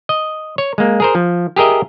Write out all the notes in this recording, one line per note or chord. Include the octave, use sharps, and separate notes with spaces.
D#5
C#5
G#3 A#3
G#4 A#4 C5
F3
G4 G#4 A#4 D#5 E5